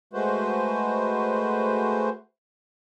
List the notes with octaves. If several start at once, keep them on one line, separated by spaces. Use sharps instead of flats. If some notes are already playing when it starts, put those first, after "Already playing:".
G#3 A3 F#4 B4 C5